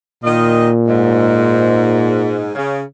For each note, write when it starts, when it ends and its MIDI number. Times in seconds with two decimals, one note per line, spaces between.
0.24 2.53 46
0.24 0.68 51
0.24 0.68 65
0.24 0.68 75
0.88 2.51 44
2.56 2.81 49